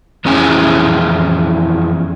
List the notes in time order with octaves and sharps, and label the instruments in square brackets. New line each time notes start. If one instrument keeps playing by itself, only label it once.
[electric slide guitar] F2 E3 C#4 E4 G#4